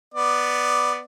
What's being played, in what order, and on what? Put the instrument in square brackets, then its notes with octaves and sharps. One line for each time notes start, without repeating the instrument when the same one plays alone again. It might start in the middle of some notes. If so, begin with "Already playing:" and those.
[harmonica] B3 D5